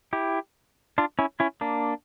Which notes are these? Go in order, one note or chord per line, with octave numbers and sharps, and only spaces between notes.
E4 G4
D4 F4
C#4 E4
C#4 E4
A#3 D4